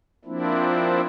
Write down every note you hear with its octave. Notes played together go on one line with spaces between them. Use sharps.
F3 A#3 C4 D4 E4